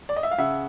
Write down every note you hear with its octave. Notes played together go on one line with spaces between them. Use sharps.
D5
D#5
E5
F5
C#3 E5 F#5